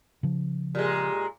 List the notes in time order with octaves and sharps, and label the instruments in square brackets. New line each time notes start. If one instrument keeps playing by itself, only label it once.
[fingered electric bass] C#3 F3
[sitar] A#2 G#3 [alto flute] G4